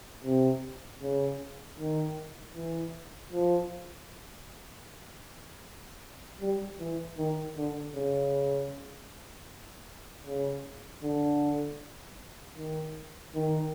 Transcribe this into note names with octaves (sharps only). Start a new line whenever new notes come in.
C3
C#3
D#3
E3
F3
G3
E3
D#3
D3
C#3
C#3
D3
D#3
D#3